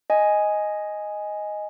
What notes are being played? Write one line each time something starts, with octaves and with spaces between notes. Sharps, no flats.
D#5 G#5